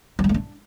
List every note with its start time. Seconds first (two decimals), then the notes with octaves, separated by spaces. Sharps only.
0.19 F3
0.24 F#3
0.29 A3
0.34 D4